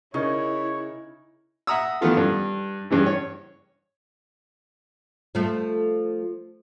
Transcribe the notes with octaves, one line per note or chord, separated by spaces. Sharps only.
C#3 D#4 E4 A#4 C#5
E5 F#5 A#5 D#6 E6
D#3 E3 A3 B3 F4 A4
G2
G2 C#3 E3
C#5
F3 A3